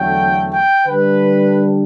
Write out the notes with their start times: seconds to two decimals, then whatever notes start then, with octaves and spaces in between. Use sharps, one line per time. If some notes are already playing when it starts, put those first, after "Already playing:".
Already playing: E2 D3 F#3 A3 G5
0.50 G5
0.86 D3 G3 D4 B4